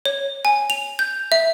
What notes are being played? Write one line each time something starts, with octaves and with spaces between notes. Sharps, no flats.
C#5
G#5
F7
G6
E5